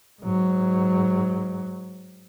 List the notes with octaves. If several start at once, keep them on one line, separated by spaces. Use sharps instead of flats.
G#2 F#3